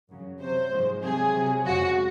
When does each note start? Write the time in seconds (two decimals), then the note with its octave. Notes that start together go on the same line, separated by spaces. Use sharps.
0.09 F#2 C#3 F#3
0.39 C3 F#3 C5
0.71 G#2 F3 G#3
1.03 C3 F#3 G#4
1.34 C3 F#3
1.65 F2 C#3 G#3 F#4